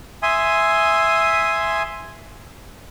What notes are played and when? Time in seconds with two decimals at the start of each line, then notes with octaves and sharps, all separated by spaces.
0.23 E5 G#5 C6 D#6